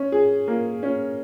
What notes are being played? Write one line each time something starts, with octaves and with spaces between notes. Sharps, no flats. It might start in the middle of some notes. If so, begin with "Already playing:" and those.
Already playing: C#4
G#4
A#3
C#4